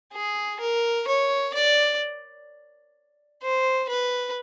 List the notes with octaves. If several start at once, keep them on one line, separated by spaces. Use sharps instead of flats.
G#4
A#4
C#5
D5
C5
B4